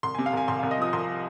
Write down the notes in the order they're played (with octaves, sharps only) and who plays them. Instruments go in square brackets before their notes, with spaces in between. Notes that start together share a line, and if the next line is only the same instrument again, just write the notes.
[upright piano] C2 C6
C3 G#5
F5
C2 G#5
C2 C6
C2 F5
D#5
F3 D#6
C2 C6